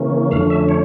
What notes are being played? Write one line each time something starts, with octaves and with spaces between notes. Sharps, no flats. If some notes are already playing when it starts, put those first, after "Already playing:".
Already playing: C#3 E3 A#3 C#4
F2 D3 A3 C#4 F5
E5
C#5